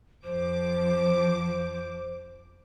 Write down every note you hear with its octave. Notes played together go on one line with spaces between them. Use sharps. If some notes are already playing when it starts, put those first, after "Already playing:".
F2 F3 C5 D6